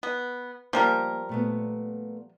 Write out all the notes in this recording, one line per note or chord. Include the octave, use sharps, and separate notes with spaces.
B3
F3 G3 A#3 A#4
A#2 A3 B3